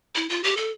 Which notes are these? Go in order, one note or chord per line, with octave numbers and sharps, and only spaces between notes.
E4
F4
G4
A4